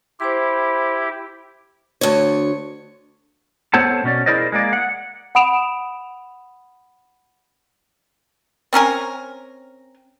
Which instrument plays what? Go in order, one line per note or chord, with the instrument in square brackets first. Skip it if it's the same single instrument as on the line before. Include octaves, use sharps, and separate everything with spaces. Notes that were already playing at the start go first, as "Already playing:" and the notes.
[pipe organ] E4 G4 [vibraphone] C5 B5 C6
[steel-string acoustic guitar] D2 C#5
[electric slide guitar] B3 A4 C5 C#5 F#5 A5
B2 C#4 D5
E4 G#4 A#4 C5 D5 D#5
G#3 A#3 D5
F#5
[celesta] F#5 B5 D#6 D7 E7 F7
[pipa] C4 C#4 A#4 G#5